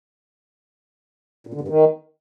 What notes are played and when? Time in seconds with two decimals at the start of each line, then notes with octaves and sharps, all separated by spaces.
1.47 A#2
1.54 D3
1.61 G2
1.68 D#3